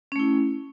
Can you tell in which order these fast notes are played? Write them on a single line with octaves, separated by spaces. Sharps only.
C#4 A3 E4